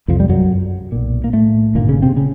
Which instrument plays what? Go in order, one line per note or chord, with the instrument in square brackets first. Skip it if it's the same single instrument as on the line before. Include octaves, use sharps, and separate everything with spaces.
[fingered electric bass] C2 F2 C3 F3
G3
F#2 F#3
B1 A#2
A#3
A2 A3
G#1 G2 A#2 D3 A#3
C#3 C#4
C3 C4
C#3 C#4